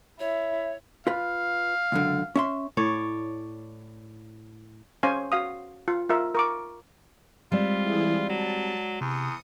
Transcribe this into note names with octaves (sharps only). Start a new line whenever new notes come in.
E4 C#5 E5
F4 B4 F5
C#2 F#2 D3
C#4 E5 C6
A2 C#5 D5
C#4 C5 C#5 F5 G#5
F#4 F5 D#6
F4
F4 A#4 E5
A#4 C#6 D6
G3 G#3 C4 F4 D5
E3 E4 G#4
F#3 A5
E2 C3 D#6 C#7